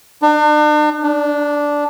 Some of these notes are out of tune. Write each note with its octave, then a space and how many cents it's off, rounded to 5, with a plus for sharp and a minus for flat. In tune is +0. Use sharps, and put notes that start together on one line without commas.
D4 +40
D4 -10